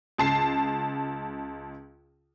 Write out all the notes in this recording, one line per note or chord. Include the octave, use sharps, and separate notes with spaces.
C#2 A5 C7